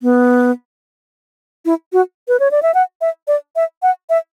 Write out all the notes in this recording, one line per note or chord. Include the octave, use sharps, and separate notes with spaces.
B3
E4
F#4
B4
C#5
D5
E5
F#5
E5
D5
E5
F#5
E5